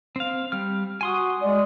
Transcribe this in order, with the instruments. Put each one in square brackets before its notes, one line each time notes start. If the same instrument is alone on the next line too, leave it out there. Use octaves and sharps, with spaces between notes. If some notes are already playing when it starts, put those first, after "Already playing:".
[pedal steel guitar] C4 F5
G3 F6
[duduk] F#4 [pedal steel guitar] G#5 C6 D#6
[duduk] G#3 [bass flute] D5